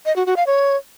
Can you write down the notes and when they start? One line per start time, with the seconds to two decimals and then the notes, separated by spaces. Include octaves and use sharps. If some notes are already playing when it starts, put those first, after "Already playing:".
0.06 D#5
0.16 F#4
0.26 F#4
0.36 F5
0.47 C#5